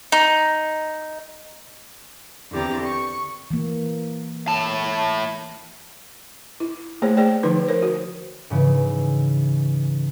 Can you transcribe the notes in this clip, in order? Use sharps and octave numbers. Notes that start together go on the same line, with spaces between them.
D#4
E2 D3 C4 G4 A#5 A6
C#6
E3 A#3
E4 A5
E4
A3 A#3 G#4 C5 C#5
G#4 C5 D5 G5
D3 F3 D#4 B4
A#4 C5 C#5
F#4
G#2 C#3 E3